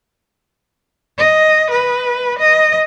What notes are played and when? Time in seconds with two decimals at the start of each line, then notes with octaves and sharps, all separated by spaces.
1.18 D#5
1.71 B4
2.39 D#5